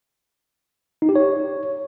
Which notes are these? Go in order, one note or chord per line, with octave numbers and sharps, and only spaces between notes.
D#4
G4
C#5